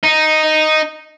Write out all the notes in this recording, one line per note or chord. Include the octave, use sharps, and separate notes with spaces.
D#4